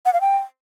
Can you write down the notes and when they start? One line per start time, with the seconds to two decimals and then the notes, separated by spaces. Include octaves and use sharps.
0.05 F#5
0.13 F5
0.21 G5